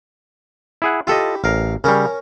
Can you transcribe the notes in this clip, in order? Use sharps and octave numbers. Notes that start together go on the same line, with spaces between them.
E4 G#4 F#5
E4 F4 G4 A4 D#5
A1 A#4 F5
C#3 G3 C#4 A#4